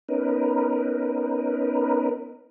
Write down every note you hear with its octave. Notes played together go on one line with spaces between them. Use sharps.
B3 C#4 D#4 A#4 B4